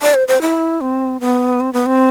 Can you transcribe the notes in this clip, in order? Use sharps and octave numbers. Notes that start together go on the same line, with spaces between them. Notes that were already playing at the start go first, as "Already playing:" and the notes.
D5
C5
C5
E4
C4
B3
C4
B3
C4